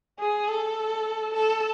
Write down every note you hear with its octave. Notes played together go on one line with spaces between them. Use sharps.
G#4
A4
A4